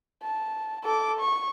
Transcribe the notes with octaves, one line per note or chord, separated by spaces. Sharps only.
A5
A4 D6
C#6